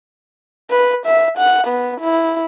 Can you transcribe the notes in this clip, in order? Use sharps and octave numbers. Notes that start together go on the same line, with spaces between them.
B4
E5
F#5
B3
E4